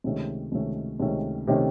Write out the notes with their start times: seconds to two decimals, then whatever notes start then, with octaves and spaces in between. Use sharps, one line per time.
0.04 C#2 C3 D#3 A3 C#4
0.52 C#2 C3 D#3 A3 C#4
1.00 C#2 C3 D#3 A3 C#4
1.47 C3 D#3 A3 C#4